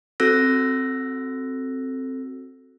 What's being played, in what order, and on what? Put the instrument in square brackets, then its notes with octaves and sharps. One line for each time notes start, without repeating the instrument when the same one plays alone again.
[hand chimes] C4 F#4 A4 E6 F#6 A#6